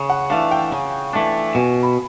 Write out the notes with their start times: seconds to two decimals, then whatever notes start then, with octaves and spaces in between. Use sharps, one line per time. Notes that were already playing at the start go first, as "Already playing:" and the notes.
Already playing: C#3
0.10 F#5
0.30 E3 A3 D4 F5
0.51 G5
0.72 C#3 G#5
1.13 E3 A3 D4
1.55 B2 G#5
1.83 B5